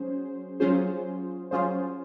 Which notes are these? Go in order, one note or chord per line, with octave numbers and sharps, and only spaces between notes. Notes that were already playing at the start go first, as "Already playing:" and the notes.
Already playing: F#3 C#4 G#4 C5
F#3 C#4 F4 G#4 C5
F#3 C#4 F4 G#4 C5